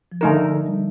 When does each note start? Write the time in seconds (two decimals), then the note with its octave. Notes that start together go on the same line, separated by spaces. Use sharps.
0.12 F3
0.21 D3 D#3 A3 D#4 A#4
0.66 G3